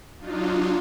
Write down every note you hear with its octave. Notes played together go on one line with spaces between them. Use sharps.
F#3 D4 D#4 F4